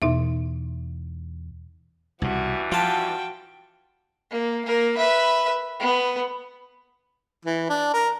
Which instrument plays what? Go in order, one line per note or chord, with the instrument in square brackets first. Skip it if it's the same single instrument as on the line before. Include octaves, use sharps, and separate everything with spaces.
[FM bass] E2 [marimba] B2 D#4 E5
[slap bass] C2 B2 [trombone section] G2 E3 [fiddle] F#4
[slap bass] F3 [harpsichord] F4 A5 [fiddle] F#4 G5
[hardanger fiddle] A#3
A#3 A#4
B4 E5
B3
[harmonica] E3
D4
A#4